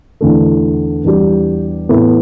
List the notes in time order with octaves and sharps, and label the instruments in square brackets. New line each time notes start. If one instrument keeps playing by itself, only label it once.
[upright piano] E2 D3 A3
E2 E3 G3 D4 G4
A2 E3 B3 E4 A4